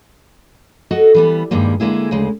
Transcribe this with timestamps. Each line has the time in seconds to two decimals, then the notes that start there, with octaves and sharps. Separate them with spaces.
0.91 F#4 A4 D#5 F#5
1.14 E3 G3 B3
1.51 E2 G2 D#3 G3 G#3 A#3
1.80 D3 G#3 A#3 E4 G#4
2.11 D2 C#3 G#3